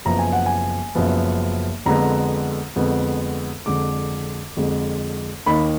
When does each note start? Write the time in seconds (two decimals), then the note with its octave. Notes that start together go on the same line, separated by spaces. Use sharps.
0.05 F#1 F#2 F3 B3 A#5
0.19 G#5
0.33 F#5
0.46 G#5
0.95 F#1 F#2 F3 B3
1.86 F2 D3 G#3 B3 A#5
2.76 F2 D3 G#3 B3
3.66 F2 D3 G#3 D6
4.57 F2 D3 G#3
5.46 D#2 D#3 A#3 D#4 B5